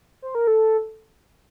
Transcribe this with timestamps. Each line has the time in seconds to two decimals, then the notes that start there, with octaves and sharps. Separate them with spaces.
0.22 C5
0.35 A#4
0.47 A4